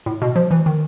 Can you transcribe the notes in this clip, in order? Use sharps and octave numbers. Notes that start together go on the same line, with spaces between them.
A2
B2
F3
E3
D#3